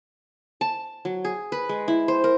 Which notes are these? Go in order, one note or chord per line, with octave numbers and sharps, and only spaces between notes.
A5
F#3
G#4
B4
G#3
E4
C5
A#4